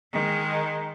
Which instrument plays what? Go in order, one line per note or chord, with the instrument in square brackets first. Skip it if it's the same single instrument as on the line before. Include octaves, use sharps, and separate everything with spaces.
[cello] D#3 G#3